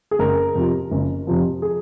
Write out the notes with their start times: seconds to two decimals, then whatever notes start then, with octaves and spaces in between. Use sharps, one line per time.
0.11 G#4
0.19 F#1 A#4
0.55 F2 C3 F3
0.91 F#1
1.27 F2 C3 F3
1.62 G#4